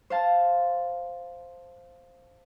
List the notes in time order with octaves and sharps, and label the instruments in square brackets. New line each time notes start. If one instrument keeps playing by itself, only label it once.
[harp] C5 F5 A5